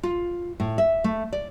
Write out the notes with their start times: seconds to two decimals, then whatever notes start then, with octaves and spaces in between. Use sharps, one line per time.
0.03 F4
0.60 A2
0.78 E5
1.04 A3
1.33 D5